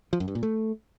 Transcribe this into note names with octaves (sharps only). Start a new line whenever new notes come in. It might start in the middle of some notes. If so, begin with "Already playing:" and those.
F3
F#2
G2
A#2
A3